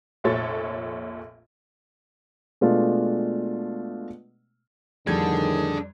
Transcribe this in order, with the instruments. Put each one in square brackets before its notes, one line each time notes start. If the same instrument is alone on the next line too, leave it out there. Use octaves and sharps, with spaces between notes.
[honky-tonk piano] F1 A#1 A#2 A4 C#5 A6
[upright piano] B2 G#3 A3 D4 F4
[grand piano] F2 G3 G#6 [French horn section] A2 D#3 [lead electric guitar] D4 A4 [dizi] G#4